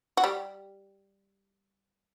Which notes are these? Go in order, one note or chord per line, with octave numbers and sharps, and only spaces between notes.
F#4
G3 G4